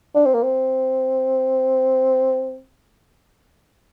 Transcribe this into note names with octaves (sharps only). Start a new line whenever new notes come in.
D4
C4
A#3
C4